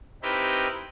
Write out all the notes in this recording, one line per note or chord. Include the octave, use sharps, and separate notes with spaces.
C4 D#4 E4 G4 A#4 B4